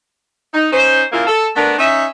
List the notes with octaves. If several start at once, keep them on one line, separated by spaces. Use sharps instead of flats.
D#4
C#4 D#4 C5
C#3 A#3 E4 F4
A4
A3 B3 D4 A#4
C#4 D#4 E5